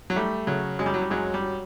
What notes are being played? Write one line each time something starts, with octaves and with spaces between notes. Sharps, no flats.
F#3
G3 A3
C#3 F#3
F#2 G#3
G3
F#3
G3
F#2 F#3 G#3
G3
F#3